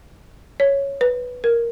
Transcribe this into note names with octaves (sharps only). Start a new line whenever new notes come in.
C#5
B4
A#4